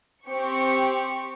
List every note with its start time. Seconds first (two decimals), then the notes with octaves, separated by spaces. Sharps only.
0.24 C4 G4 C#6 C#7